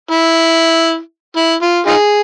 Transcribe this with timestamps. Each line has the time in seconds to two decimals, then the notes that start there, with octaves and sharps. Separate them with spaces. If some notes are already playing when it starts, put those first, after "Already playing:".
0.11 E4
1.36 E4
1.62 F4
1.87 D#4 F4 G#4